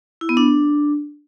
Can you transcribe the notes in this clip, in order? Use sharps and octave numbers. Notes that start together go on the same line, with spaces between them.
E4
B3
D4